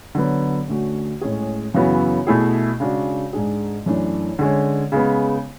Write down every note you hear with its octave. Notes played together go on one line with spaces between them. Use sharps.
D3 F#3 B3
D2 D3 A3 C#4 F#4
A2 G#3 C#4 G#4
F#2 C#3 E3 B3 F#4
B2 A3 E4 G#4
C#3 G#3 D4 F#4
G#2 G#3 D4 G#4
F#2 E3 A3 D4
D3 G#3 C#4
C#3 G#3 B3